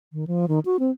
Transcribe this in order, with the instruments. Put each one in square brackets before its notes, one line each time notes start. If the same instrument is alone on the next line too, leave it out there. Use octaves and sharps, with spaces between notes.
[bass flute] D#3
F3
D#3
F#4
C4